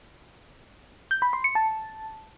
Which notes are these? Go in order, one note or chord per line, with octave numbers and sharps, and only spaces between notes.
G6
B5
C6
C#7
A5